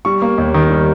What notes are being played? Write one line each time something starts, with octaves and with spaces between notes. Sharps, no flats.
G3 C#6
A#3
D#2
D#3
G3